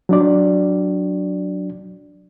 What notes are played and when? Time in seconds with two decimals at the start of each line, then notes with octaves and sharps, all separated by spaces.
0.09 F#3 D4 D5